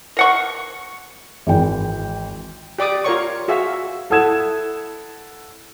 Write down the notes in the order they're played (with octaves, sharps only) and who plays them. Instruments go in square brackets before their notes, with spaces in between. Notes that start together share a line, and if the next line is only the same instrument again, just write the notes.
[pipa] A#4 F#5 C#6
[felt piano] G#1 E3 G5
[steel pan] G4 D5 D6 D#6
F4 A#4 C#5 C#6
F#4 G#4 E5 F5
[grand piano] E4 A4 F#5 D#6 G#6 E7